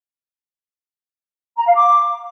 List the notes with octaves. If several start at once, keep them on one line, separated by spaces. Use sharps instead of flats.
A#5
F5
D6